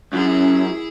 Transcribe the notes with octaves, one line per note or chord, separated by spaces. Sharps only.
F#2 C#4 E4 G#4